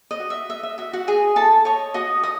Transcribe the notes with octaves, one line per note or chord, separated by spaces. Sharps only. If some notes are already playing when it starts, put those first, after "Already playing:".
D#5
F#4
E5
D#5 E5
E5
F#4 E5
F#4 F#5
G#4 D#5 G#5
E4 A4 A5
C#5 D#5 C#6
F#4 D#5 D#6
D#5 D#6